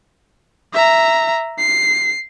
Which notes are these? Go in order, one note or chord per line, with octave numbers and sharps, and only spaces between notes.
E5 A#5
C7